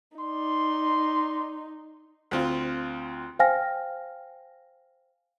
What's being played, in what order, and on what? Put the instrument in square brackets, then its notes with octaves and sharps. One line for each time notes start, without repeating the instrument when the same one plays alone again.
[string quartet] D#4 [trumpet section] D5 C6
[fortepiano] D2 C4 F4
[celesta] C5 F5 G5 G#5 F6 A#6